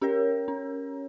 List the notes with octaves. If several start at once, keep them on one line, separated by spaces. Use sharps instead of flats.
C#4 G4 A#4 C#5
C#4